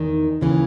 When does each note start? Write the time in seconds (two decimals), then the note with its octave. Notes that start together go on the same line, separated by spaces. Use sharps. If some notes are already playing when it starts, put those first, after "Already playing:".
Already playing: E2 D#3
0.41 D#2 C#3 E3